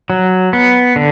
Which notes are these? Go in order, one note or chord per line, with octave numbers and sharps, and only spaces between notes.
F#3
B3
D3